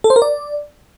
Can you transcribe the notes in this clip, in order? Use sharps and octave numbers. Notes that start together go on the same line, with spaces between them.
A4
C5
A#4
D5